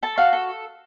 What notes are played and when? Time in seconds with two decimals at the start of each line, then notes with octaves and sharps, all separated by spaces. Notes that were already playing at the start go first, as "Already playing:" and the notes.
0.03 A4 A5
0.18 F#4 F5
0.33 A4